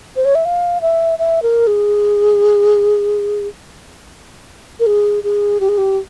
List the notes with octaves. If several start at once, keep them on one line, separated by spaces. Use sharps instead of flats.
C5
C#5
E5
F5
E5
E5
A#4
G#4
A#4
G#4
G#4
G4
G#4
G4